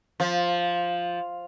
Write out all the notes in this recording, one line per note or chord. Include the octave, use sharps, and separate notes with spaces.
F3